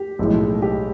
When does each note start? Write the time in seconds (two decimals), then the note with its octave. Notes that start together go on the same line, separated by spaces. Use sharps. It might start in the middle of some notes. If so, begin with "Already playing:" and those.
Already playing: G4
0.19 B1 A2 F3 G#3
0.62 G4